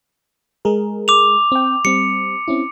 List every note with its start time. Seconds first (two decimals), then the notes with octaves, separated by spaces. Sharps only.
0.65 G#3 G#4 A#4
1.08 D6 F7
1.52 C4 G5
1.85 G3 C4 C#7
2.48 C4 C#4 E4